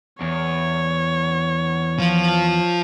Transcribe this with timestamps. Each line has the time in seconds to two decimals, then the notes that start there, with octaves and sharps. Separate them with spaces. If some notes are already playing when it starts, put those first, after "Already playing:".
0.21 E2 C#5
1.99 F3 F4